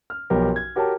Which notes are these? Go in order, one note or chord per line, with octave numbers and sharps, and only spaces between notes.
F6
B1 F3 G4 A#4
G#6
F#4 G4 A#4 C#5 A5